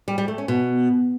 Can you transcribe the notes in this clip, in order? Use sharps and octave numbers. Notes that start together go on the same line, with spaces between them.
G3
G3
A3
C#4
B2